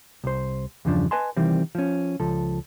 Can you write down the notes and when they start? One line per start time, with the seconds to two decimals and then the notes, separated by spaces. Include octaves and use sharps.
0.24 C2 C5
0.85 E2 G2 C#3 F3 D4
1.11 B4 D#5 G#5 A5 C6
1.37 C3 D#3 E3 G3 C4
1.75 F3 C#4
2.20 C#2 F3 A4